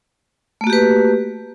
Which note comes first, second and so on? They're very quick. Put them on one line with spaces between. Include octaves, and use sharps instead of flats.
A3 A#3 F#4 G4 B4